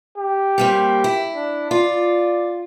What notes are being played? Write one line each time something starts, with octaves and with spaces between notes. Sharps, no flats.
G4
G3 A#3 C4
E4
D4
F4 D5